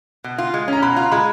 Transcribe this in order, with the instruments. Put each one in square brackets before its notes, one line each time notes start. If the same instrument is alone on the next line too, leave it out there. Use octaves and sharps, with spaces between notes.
[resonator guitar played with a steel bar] B2
F4
G#3
[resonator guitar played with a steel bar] C#4 [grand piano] A#5
[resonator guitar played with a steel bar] B2 [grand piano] B5
[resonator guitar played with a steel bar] F4 [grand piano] A#5
[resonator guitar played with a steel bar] G#3 [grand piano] B5